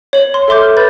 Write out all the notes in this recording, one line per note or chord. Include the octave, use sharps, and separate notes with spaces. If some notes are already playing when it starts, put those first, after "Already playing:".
C#5 F#7
C6
A4 E5 C6 D6 G6
F6
B4 B5 G6 A6